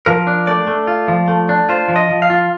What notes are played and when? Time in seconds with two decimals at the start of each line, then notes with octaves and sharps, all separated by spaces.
0.06 F3 A#4
0.27 D4
0.47 A3 D5
0.67 A3
0.87 F4
1.08 F3
1.28 A3
1.49 D4
1.69 F4 C5
1.88 F3
1.96 D#5
2.09 F3
2.22 F5
2.30 F4